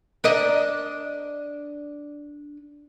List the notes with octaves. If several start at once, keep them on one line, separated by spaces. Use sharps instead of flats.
D4 A#4 D#5